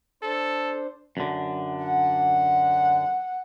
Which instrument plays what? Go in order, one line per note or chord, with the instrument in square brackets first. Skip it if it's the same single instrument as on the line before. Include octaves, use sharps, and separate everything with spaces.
[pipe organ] D4 C5 [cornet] A4
[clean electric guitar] F#2 D3
[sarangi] F#5